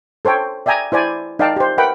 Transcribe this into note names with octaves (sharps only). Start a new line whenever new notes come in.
A4 C5 C#5 G5
D5 E5 G5 G#5 A#5 D#6
E4 C5 D5 G#5
D#4 D5 F5 G5 A5
G4 C5
A#4 B4 E5 F#5 G5 B5